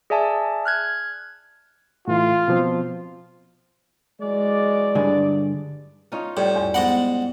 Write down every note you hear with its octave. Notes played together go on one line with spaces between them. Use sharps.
G#4 D5 E5 G#5 A5
F6 F#6 G#6
A2 E3 F4
B2 F3 C4
E3 F#3 G#3 D5
G2 D3 G#4
C#4 D#4 F4
A2 G3 C#5
E2 G#2 G#5
G#2 B3 D#5 F#5